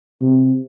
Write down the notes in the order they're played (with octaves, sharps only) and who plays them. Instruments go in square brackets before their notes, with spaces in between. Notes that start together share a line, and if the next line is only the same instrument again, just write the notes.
[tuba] C3